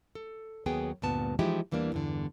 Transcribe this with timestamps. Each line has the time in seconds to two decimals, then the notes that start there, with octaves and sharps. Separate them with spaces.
0.15 A4
0.66 D#2 F#3 B3 G#4 G5
1.02 D2 G2 A#2 B3 A5
1.39 E3 F3 G#3 D#4 E4 G4
1.71 E2 E3 G3 A#3 D4
1.92 E2 G2 D3